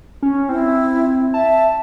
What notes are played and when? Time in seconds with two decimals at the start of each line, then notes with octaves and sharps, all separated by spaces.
0.23 C#4
0.49 C4 E4
1.34 E5 A5